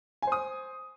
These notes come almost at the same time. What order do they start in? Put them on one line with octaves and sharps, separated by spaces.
G#5 C5 D#6